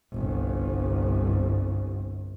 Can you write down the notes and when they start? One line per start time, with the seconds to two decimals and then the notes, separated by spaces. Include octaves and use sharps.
0.11 G1 C2